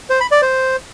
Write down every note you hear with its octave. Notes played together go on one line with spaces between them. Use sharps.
C5
B5
D5
C5